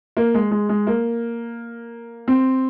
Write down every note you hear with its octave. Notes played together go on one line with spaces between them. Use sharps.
A#3
G#3
G#3
G#3
A#3
C4